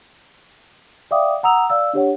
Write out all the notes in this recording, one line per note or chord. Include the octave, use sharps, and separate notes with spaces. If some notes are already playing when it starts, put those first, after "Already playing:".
D5 E5 F5 G5 D6 D#6
F#5 A#5 D#6 E6 F7
D5 F5 E6
D4 G4 C#5 F#5